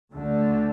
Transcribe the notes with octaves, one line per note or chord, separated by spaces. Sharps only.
D2 D3 A3